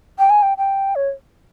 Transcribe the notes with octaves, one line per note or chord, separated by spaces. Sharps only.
G5
G#5
G5
G5
C#5